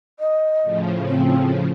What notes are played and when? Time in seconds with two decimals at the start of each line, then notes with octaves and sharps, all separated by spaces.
0.19 D#5
0.63 A2 C#3 F3
1.08 C4